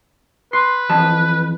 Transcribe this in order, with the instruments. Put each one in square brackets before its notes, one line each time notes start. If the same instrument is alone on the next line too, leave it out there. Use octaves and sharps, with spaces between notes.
[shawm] B4 [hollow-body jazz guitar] C6
[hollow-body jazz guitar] F2 E3 A5